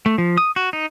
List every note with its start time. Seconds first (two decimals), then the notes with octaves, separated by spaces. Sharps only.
0.06 A3
0.18 F3
0.38 D#6
0.56 F#4
0.73 D#4